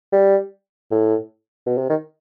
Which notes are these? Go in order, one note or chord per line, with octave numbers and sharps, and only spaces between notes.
G3
A2
B2
C3
D#3